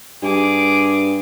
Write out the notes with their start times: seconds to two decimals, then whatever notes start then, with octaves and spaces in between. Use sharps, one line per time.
0.23 G2 G#4 D6